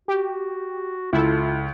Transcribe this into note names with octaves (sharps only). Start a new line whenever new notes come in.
F#4 G4
C#2 E4 F4 A4